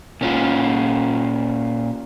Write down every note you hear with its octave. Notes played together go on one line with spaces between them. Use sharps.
A#2 C#4 F4